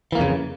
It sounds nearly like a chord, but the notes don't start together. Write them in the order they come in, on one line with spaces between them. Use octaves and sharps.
E3 A#3 F2 C#3